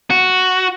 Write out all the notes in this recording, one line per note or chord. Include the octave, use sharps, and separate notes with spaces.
F#4